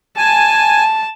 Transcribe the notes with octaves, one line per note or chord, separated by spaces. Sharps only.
G#5 A5